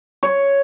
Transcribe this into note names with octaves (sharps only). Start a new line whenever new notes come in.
C#5